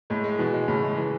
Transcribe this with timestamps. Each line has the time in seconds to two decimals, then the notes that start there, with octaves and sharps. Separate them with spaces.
0.10 A2 G#3
0.24 G#3
0.39 B2 E3
0.54 G#3
0.68 A2 C#3
0.83 G#3
0.98 E3